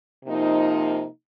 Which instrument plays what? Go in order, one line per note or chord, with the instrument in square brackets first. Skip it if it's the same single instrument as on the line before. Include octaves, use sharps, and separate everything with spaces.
[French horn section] C3 F3 A#3 D#4